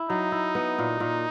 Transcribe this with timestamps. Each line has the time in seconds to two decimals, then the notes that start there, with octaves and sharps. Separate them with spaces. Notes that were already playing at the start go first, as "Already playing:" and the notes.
Already playing: E4
0.10 F#3 D#4
0.32 E4
0.55 B3
0.79 A#2
1.00 A#2